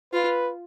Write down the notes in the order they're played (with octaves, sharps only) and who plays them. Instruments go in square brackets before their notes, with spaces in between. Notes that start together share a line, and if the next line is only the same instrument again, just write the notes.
[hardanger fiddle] F4 [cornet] B4